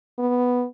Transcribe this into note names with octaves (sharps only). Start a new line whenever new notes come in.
B3